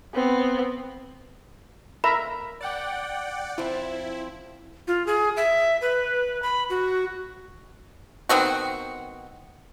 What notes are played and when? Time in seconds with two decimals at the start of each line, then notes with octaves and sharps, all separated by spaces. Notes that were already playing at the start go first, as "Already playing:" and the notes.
0.14 B3 C4
2.04 A#4 E5 A#5 B5
2.61 D5 F#5 G5
3.58 F3 C4 E4
4.88 F4
5.07 G#4
5.37 E5
5.81 B4
6.43 B5
6.70 F#4
8.29 D#3 B3 C4 F#4